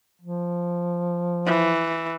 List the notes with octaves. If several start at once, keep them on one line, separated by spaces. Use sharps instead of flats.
F3
E3